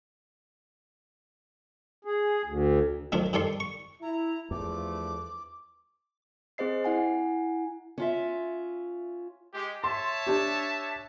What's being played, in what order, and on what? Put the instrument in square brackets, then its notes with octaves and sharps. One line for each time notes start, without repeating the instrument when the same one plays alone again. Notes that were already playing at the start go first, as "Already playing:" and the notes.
[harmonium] G#4
D2
[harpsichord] D2 D#3 F3 F#3 D4
G2 D#3 A4 D5 C6
C#6
[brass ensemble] E4 [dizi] A#5
[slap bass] E2 [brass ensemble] G2 F3 A3 [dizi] D6
[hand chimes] C4 G#4 C5 D#5 C7
E4 F#5 G#5
[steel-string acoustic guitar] C#4 F4 E5
[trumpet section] G#3 G4
[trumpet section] C#5 E5 A5 [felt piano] C6
[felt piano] D4 G4